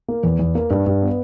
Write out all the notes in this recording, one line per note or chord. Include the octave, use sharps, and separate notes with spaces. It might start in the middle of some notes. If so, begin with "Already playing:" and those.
A#3
E2
E2
A#3
G2
G2
B3